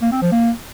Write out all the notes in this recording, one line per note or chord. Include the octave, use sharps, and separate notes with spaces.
A#3
C4
F3
A#3